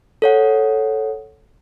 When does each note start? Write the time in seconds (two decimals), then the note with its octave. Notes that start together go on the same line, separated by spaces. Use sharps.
0.22 A4 C#5 F#5